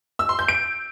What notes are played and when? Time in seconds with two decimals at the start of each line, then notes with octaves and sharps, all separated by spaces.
0.19 E6
0.29 C6
0.39 G6
0.48 D7